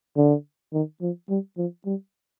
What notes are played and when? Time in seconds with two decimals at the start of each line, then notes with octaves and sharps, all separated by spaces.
0.17 D3
0.73 D#3
1.01 F3
1.29 G3
1.57 F3
1.86 G3